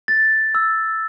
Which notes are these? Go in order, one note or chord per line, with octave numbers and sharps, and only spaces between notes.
A6
E6